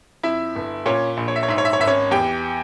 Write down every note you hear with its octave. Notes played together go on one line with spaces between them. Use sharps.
F2 E4 E5
G1
A#2 C#4 C#5
A#1
C#5
E5
C#5
G#2 E5
C#5
E5
C#5
G#1 E5
C#4 C#5
E2 G4 G5